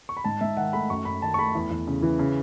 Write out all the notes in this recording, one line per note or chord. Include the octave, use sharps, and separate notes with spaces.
C#6
B5
G#2 A5
G#2 E5
D#3 F#5
A3 B5
F#2 C#6
F#2 B5
D#3 A5
C#6
A3 B5
E2
E2
C#3
E3
C#3